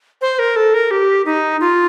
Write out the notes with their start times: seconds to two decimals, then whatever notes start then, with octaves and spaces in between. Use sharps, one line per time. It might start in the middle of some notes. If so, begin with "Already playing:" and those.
0.22 C5
0.39 A#4
0.56 A4
0.74 A#4
0.91 G4
1.26 D#4
1.61 F4